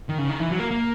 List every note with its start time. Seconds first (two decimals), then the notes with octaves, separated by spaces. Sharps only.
0.09 D#3
0.18 C#3
0.29 D#3
0.40 E3
0.49 F#3
0.59 A#3
0.71 A#3